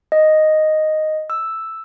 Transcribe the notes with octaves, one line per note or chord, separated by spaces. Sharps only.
D#5
E6